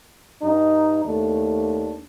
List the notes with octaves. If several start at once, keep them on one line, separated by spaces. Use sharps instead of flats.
G2 D#4
D#2 A3 D4